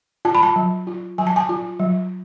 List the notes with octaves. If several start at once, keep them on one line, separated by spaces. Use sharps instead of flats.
F4 A5
B5
A5
F#3
F4
F#3 G#5
A5
G#5
F4
F#3